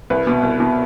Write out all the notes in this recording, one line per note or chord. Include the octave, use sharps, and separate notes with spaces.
C2 B4
B2
C2
B2